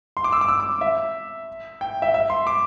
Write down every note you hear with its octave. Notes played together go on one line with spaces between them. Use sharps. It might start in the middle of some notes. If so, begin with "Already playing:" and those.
C6
D6
E6
D6
E6
D6
E5
G5
E5
E5
C6
D6